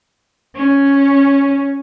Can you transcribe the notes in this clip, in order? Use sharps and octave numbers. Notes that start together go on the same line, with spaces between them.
C#4